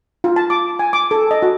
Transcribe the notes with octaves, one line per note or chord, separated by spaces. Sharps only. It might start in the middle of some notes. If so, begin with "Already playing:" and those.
F4
A5
D6
G#5
D6
A4
D#5
F#4